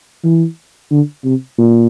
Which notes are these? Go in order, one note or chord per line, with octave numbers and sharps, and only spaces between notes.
E3
D3
C3
A#2